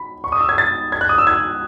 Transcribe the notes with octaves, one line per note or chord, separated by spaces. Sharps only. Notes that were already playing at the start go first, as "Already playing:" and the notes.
Already playing: B5
C#6
D#6
E6
G#6
A6
G#6
F#6
D#6
E6
G#6